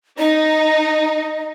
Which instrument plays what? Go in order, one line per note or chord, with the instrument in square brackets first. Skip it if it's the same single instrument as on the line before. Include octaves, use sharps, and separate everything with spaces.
[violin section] D#4 [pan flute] D#5